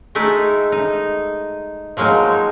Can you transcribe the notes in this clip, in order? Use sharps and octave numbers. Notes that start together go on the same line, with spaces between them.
G#3 A3 D#4 E4
D#4
F3 F#3 G#3 A#3 D#4